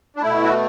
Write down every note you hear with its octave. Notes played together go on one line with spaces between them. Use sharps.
D4
B2 A3 E4
F#4